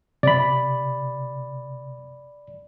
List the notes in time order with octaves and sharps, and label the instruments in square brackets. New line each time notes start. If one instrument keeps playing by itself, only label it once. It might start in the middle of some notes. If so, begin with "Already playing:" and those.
[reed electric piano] C3 [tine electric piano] D5 B5